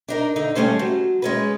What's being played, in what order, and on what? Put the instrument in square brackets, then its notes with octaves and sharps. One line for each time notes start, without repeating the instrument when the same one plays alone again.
[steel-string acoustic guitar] D4 D#4 A#4
D3 D#4
D#2 G3 A3 C#4 C5
F#3
G#3 C#4 B4